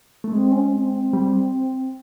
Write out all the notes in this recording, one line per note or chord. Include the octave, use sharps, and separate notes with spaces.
A3
G#3 C4
C#4
C4
C4
G3